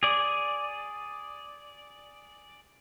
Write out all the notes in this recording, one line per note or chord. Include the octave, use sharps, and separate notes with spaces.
G#4 D5